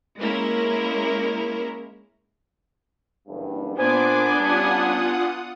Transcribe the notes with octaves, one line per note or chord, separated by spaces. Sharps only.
G#3 A#3 C#4 E4 A#4
F#1 E2 G2
A#2 B3 D4 C5 G#5 D6
G3 C#4 F4 F#5 A5 D#6